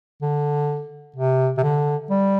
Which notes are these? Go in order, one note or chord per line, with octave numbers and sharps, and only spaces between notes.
D3
C3
C3
D3
G3